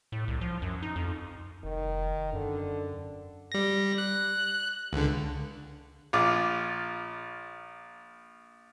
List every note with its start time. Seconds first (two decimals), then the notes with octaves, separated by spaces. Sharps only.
0.12 A2
0.28 C2
0.41 F3
0.62 F#2
0.83 D#4
0.96 F2
1.64 F1 D#3
2.33 F#2 D3
3.52 G3 A#6
3.98 F#6
4.93 C#2 D3
6.13 A#1 F4 D6